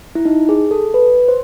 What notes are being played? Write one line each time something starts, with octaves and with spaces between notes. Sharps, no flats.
E4
D#4
G#4
A4
B4
C5